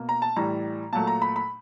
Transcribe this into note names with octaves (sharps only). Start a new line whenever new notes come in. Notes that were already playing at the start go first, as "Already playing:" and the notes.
Already playing: B2 A#3
A#5
A5
A2 E3 G3 A#5
A#2 F#3 A3 A5
A#5
B5
B5